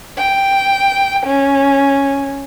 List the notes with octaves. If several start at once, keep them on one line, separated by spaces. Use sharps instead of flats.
G5
C#4